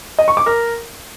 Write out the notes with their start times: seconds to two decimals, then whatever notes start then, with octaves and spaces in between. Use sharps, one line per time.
0.19 D#5
0.28 C#6
0.37 D6
0.46 A#4